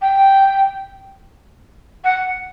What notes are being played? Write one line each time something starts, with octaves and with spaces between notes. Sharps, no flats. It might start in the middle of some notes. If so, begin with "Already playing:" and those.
G5
F#5